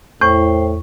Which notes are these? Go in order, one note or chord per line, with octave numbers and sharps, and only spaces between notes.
E2 A2 C5 G5 C#6